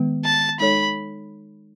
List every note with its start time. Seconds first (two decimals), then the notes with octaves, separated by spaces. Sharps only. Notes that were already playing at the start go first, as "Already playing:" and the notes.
Already playing: D#3 G#3 B3
0.25 A5
0.60 G#3 D#4 A4 C#5 B5